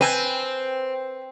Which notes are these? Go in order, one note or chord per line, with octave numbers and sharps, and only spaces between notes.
C4 B4 G#5